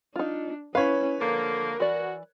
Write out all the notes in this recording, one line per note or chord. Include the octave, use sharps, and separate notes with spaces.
D4 D#4 F4
C#4 E4 B4 C#5 F5
D3 F3 A#3 A#4
E3 F#4 D5